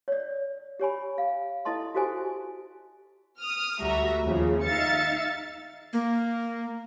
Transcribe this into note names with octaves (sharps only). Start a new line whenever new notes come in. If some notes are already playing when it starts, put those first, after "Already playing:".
C#5 D5
G4 C#5 G#5 B5
F5
E4 A4 D#5 A5 C6
F#4 G4 A4 C5 G#5
D#6 F6
D2 G3 F#4 E5 A#5
D#2 C#3 F3
D#4 E5 F5 A6 C#7
A#3